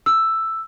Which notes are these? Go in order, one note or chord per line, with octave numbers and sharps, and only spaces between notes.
E6